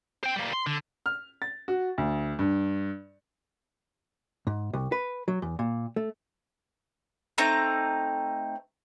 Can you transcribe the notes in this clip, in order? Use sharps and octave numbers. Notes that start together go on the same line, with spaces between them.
C5 G5
G3 A#3
C6
D3
F6
A6
F#4
D2
G2
G#2
C2
B4
F#3
E2
A#2
A3
A3 C4 D#4 A#5